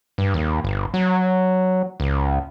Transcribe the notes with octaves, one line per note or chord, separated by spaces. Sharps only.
G2
D#2
G1
F#3
C#2